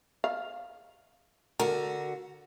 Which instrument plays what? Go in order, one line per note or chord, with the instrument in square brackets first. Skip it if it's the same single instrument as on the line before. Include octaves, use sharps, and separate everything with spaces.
[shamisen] F5
[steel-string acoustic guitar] D3 F#4 [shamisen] A#4